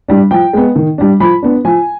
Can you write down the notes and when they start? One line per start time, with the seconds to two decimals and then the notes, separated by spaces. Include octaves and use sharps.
0.08 G3 D4
0.31 F3 G5
0.53 G#3 B3
0.76 D#3
0.98 G3 D4
1.20 F3 B5
1.43 B3 D4
1.65 F3 G#5